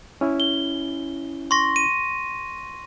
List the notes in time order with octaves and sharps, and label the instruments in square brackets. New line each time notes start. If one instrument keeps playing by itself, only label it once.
[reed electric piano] C#4 E4
[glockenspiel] G7
C6 C#6 A#6
D#7